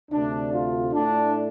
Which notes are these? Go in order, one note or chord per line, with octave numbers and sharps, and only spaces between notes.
D2 C3 A3 D4
F4
A2 A3 D4